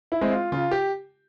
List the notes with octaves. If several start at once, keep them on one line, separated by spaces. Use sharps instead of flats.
E4
G#3 C4
F4
C#3 F4
G4